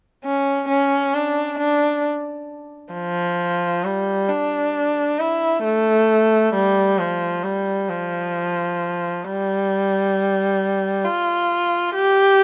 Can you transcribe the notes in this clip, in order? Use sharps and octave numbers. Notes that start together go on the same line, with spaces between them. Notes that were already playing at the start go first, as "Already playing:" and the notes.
C#4
C#4
D4
D4
F3
G3
D4
E4
A3
G3
F3
G3
F3
G3
F4
G4